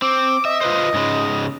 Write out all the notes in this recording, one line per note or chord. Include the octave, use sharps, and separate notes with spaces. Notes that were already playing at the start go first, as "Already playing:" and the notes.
C4 D6
D#5 E5
F4 B4 C5
G#2 C#3 G#3